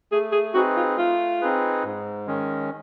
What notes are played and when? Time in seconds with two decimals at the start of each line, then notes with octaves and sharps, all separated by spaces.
0.12 A3 G#4
0.32 G#4
0.54 C4 D#4 F#4 G#4 B4
0.77 F4
0.97 A3 F4
1.41 C4 D#4 G#4 B4
1.84 G#2
2.27 D#3 G#3 C#4